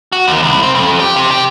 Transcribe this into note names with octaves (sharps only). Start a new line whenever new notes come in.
F#4
D#2
C2
C4
F2
G4
C3
G4